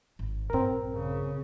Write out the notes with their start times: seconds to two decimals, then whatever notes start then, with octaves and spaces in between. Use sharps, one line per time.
0.19 G#1
0.50 A#1 G2 C4 A#4
0.94 C#3